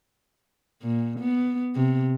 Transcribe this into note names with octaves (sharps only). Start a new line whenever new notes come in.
A#2
B3
C3